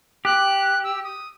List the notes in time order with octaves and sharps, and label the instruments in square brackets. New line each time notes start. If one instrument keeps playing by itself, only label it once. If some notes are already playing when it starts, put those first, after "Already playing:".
[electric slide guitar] G4 [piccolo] F#6
[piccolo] E6
D#6